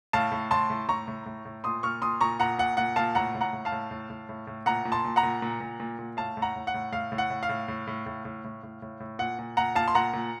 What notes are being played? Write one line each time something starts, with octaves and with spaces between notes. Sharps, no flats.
A2 F5 A5
A2
A2 A5 C6
A2
A2 A#5 C#6
A2
A2
A2
A#2 C6 D#6
A#2 C#6 F6
A#2 C6 D#6
A#2 A#5 C#6
A#2 F#5 A#5
A#2 F#5
A#2 F#5
A#2 F5 A5
A2 F#5 A#5
A2
F#5 A#5
A2
F5 A5
A2
A2
A2
A2
A2
A#2 F#5 A#5
A#2
A5 C6
A#2
F#5 A#5
A#2
A#2
A#2
A#2
A#2
A2 F5 A5
A2
F#5 A#5
A2
F#5
A2
A2 F5
A2
F#5
A2
F5
A2
A2
A2
A2
A2
A2
A2
A2
A2
A#2 F#5
A#2
A#2 F#5 A#5
A#2 F5 A5
C6
A#2 F#5 A#5
A#2